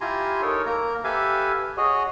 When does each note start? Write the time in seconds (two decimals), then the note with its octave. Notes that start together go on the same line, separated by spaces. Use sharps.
0.01 E4 F4 G4 G#5 A#5 C6
0.42 D#4 A4 A#4 C#5
0.66 A#3 A#4 A#5
1.04 G4 A4 B4 E5 F5 G#5
1.77 F#4 G#4 C#5 D#5